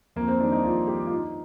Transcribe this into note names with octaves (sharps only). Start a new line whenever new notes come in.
F2 A#3
C4
D#3 G3 D4
D#4
F2 F4
D#3 G3 G4
F4
G2 D#4